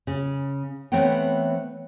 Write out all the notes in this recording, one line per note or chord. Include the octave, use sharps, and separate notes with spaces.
C#3
E3 A3 B3 C4 C#5 G5